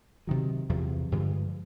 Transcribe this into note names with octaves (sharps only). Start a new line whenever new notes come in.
C3 D#3 F#3
E2 C3 F3
G2 D3 F3 G#3